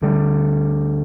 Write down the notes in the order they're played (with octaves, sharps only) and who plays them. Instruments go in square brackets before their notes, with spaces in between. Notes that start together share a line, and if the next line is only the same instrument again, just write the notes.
[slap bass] D2 D3 G3